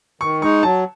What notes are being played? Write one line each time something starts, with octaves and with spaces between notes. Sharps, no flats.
D#3 C#6
G#3 D#4 C#6
F#3 A5